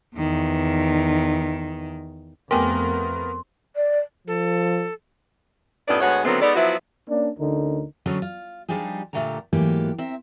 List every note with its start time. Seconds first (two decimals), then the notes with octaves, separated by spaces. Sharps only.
0.16 E2 D#3
2.51 F2 A3 B3 G4 G#4 A#4 C6
3.76 D5
4.27 F3 A4
5.87 F#2 A2 B3 D#4 D5 D#5
6.01 D2 G#3 B3 C#5 F#5
6.25 D3 D#3 F#3 A3 B3 C4
6.41 G#3 B3 D#4 A4 D5
6.55 F3 F#3 B3 E4 F#4 E5
7.09 A#3 C#4 D4
7.39 D2 D3 C#4 D#4 A#4
8.06 D3 F#3 C#4 G#4 A4 C#5
8.22 F4
8.69 F3 G3 D4 D#4 G4 G#4
9.13 A#2 D3 A3 G4 F#5 A#5
9.53 G#2 E3 F#3 A3 A#3 G4
9.98 C4 A#4 E5